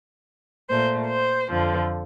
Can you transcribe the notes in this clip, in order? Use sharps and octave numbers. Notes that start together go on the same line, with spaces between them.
A#2 A3 C5
C5
F2 D3 F3